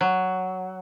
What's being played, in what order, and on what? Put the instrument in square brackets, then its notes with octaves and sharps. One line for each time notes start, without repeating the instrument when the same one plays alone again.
[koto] F#3